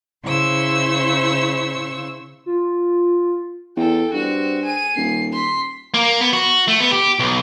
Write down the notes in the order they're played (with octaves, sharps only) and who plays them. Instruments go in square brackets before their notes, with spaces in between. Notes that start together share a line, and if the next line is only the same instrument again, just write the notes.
[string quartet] C#3 E4 C5 C#6 E6
[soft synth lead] F4
[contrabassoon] E2 [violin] A4 G5
[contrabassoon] G2 [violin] C4 F#4
[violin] G#4 D#7
[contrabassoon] D#1 [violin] C7
[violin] C6 B6
[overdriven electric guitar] A#3
B3
F#4
A3
B3
G4
B1